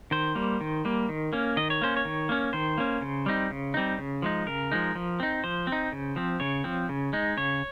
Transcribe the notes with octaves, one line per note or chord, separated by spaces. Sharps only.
D#3 C5
G3 A#3
D#3
G3 A#3
D#3
A#3 C#4
D#3 D#5
C#5
A#3 C#4 C5
C#5
D#3
A#3 C#4
D#3 C5
A#3 C#4
C#3
G3 C4 D#4
C#3
G3 C4 D#4
C#3
F3 G#3 D#4
C#3 A#4
F3 G#3 D#4
F3
C4 D#4
F3 C5
C4
D#4
C#3
F3 C4
C#3 C#5
F3 C4
C#3
G#3 D#4
C#3 C#5